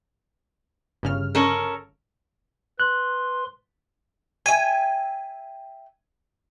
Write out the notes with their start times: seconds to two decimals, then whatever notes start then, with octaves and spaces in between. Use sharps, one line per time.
1.03 G1 C#3 F6
1.35 C#4 A4 A#4
2.80 B4 C6 F#6
4.46 E5 G5 G#5